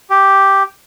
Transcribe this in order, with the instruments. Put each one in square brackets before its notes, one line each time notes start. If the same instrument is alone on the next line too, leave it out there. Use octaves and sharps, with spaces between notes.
[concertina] G4